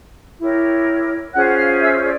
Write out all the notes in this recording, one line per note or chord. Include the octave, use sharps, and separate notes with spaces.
E4 G4 A#4 C#5
C#4 F4 G#4 C5 F#5 F#6
F5 F6
E5 E6
D5